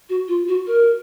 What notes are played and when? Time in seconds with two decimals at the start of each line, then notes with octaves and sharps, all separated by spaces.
0.09 F#4
0.28 F4
0.48 F#4
0.67 A#4